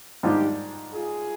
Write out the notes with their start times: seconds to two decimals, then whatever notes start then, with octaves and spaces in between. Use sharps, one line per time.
0.23 G#2 D#3 G3 D4 D#4 F4 G4
0.94 F4 G#4